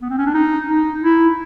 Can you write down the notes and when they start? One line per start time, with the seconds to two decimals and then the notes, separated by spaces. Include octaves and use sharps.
0.02 B3
0.10 C4
0.18 C#4
0.26 D4
0.34 D#4
0.69 D#4
1.03 E4